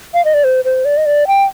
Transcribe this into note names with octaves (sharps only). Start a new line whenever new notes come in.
F5
D#5
D5
C5
C5
D5
D#5
D5
G5